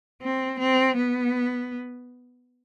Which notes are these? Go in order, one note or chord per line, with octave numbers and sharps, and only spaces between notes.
C4
C4
B3